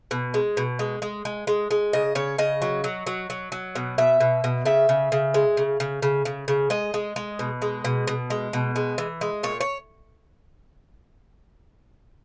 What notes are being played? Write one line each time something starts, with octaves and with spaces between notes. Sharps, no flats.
B2
G#3
B2
G#3
G#3
G#3
G#3
G#3
C#3 D#5
C#3 C#5
C#3 D#5
F#3
F#3
F#3
F#3
F#3
B2
B2 E5
B2
B2
C#3 E5
C#3
C#3
G#3
C#3
C#3
C#3
C#3
C#3
G#3 D#5
G#3
G#3
B2
G#3
B2
B2
G#3
B2
G#3
E3
G#3
A#2 C#5
C#5